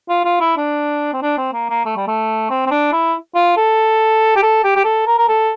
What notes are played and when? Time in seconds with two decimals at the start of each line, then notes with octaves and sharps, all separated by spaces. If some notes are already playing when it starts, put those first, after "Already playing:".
0.09 F4
0.25 F4
0.41 E4
0.57 D4
1.13 C4
1.22 D4
1.37 C4
1.53 A#3
1.70 A#3
1.85 A3
1.97 G3
2.07 A3
2.50 C4
2.66 C4
2.71 D4
2.92 E4
3.35 F4
3.57 A4
4.36 G4
4.43 A4
4.64 G4
4.76 G4
4.85 A4
5.07 A#4
5.18 A#4
5.29 A4